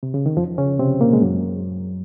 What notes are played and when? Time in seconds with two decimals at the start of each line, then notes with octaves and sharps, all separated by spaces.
0.03 C3
0.14 C#3
0.26 D#3
0.36 F2 F3
0.58 C#3 C#4
0.79 C3 C4
1.00 A#2 A#3
1.13 G#3
1.22 F#2 F#3